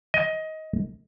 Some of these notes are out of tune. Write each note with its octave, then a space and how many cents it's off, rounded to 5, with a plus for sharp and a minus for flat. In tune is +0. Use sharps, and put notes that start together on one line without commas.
D#5 +20